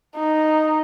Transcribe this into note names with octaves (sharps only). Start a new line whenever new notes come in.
D#4